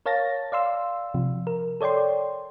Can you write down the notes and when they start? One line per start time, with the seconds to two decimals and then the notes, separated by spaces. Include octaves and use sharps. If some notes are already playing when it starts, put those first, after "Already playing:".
0.06 A#4 C#5 F5 A5 A6 A#6
0.52 D5 F5 C6 E6
1.14 C3 F3
1.47 A#4
1.81 A4 C#5 D5 G5 C6